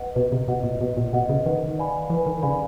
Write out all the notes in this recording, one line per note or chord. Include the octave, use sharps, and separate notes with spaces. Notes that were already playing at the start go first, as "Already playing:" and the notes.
Already playing: B4 D#5 F#5
B2 B4
C3
B2 D#5 F#5
A#2
B2 B4
A#2
B2 D#5 F#5
C#3
D#3 B4
D5 F5 G#5 B5
E3 B4
D#3
C#3 D5 F5 G#5 B5